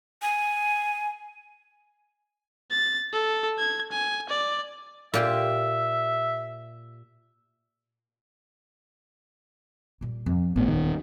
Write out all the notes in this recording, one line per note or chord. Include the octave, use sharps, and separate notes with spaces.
G#5
A6
A4
G#6
G#5
D5
A#2 G4 E5 C6
A#2 G3
F2
G#1 A2 B3
D#1 D#3